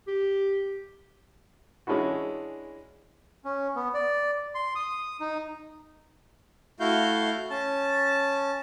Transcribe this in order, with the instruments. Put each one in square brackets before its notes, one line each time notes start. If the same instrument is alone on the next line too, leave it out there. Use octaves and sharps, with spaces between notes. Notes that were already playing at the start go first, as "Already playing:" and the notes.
[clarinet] G4
[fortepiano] E3 G#3 C#4 D4 E4 F#4
[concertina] C#4
B3
D5
C6
D#6
D#4
[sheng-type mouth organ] A3 E4 F#4 F5 G6
C#4 A5